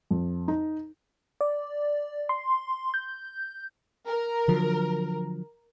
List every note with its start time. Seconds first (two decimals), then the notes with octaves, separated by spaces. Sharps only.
0.11 F2
0.48 D#4
1.41 D5
2.29 C6
2.94 G6
4.07 A#4
4.48 D3 F3 F#3